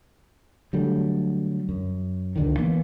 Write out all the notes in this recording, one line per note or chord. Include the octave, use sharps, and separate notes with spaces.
D3 F#3 G3 A3
F#2
C#2 D3 D#3
E3 A#3 B3